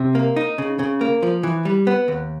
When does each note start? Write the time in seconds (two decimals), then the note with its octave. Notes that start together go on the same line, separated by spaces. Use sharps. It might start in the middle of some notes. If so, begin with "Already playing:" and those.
Already playing: C3
0.15 A#3
0.36 D#4
0.58 C#3
0.79 C#3
1.01 A#3
1.23 F3
1.43 E3
1.65 G3
1.87 B3
2.08 D#2